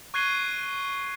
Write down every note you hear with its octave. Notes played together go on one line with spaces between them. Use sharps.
C#6 F#6 G#6 C7 D#7 G7